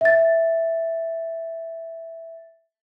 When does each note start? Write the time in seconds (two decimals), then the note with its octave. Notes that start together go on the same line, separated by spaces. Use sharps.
0.01 E5 A6